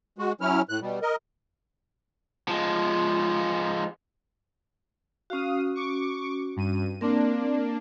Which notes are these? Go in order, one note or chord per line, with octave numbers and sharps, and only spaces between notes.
G#3 F#4
F#3 C#4 E4 F6
A2 F#6
B2 G3
A#4 D#5
F3 G#3
C#4 F#4 F5 D#6
C#6 D6
G2 D#7
A#3 C4 D4 A#4